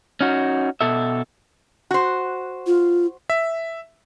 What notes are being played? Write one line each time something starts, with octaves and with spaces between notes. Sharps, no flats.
C#4 D#4 F#4
B2 A4 E5
F#4 C5
F4
E5